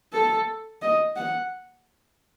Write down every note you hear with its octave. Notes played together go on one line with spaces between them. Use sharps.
A4
D#5
F#5